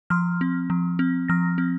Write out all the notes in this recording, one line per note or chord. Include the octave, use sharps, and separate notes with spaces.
F3 C6 F6
C4
F3
C4
F3 F6 A#6
C4